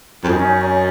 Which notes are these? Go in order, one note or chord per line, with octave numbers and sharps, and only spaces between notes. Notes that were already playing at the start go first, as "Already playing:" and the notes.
F2
F#2 D#4
C#4
D#4
C#4
C#4